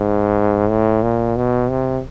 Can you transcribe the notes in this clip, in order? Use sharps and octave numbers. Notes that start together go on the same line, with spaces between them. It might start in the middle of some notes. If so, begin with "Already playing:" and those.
Already playing: G#2
A2
A#2
B2
C3